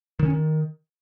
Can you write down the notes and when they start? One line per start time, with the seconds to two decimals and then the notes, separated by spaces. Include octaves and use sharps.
0.19 D#3
0.25 C#4
0.30 D#3